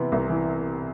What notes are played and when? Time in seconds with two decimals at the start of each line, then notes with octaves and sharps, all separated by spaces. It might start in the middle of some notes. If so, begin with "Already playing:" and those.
Already playing: C3 E3 B3
0.12 C2
0.29 E3